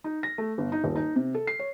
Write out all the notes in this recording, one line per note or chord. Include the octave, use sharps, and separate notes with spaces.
D#4
A#6
A3
G1
D#4
D#1
D#4
C3
A4
C7
C#5